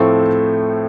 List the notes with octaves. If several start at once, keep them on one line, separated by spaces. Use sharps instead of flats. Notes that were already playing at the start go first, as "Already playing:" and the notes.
Already playing: A2 F3 A3 C4 C#6